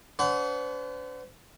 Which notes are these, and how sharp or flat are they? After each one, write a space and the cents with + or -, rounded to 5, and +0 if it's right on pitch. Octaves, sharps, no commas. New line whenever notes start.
D4 -45 C5 -45 F#5 +0